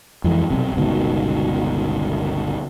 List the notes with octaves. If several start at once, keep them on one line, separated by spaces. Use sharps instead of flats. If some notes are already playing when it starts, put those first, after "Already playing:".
F2 E3 G#3
B1 C3
G1 C#2 B2 D#3